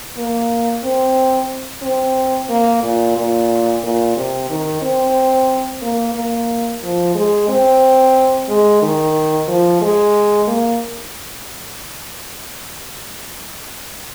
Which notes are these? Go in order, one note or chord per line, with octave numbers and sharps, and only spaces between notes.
A#3
C4
C4
A#3
A#2
A#2
A#2
C3
D#3
C4
A#3
A#3
F3
G#3
C4
G#3
D#3
F3
G#3
A#3